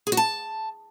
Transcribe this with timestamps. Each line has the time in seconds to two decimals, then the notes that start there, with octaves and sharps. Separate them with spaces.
0.07 G#4
0.12 F#4
0.17 A5